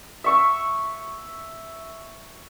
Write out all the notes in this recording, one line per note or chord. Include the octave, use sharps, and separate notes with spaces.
E5 C#6 E6